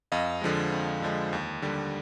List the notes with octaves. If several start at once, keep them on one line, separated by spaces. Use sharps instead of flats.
F2 D#5 F5
D3 F3 G#3
F2
D3 F3 G#3
D#2
D3 G3